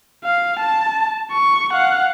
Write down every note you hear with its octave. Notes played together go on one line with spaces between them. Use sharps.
F5
A5
C#6
F5 F#5